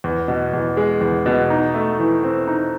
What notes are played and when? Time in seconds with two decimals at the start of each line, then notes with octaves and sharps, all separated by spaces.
0.04 E2
0.28 B2
0.53 E2
0.77 G#3
1.01 E2
1.26 B2
1.50 D#4
1.74 A3
1.99 E3
2.23 C4
2.47 D#4